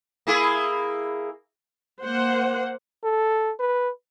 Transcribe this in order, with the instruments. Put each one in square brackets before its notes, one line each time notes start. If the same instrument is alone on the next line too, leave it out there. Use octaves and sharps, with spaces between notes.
[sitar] A#3 E4 G#4
[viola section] A#3 C5 F#5
[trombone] A4
B4